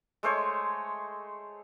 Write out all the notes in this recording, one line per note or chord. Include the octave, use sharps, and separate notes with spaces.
G#3 A3 C5 C#5